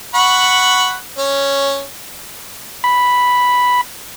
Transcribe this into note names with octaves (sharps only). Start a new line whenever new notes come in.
F#5 B5 C#6
C#4
B5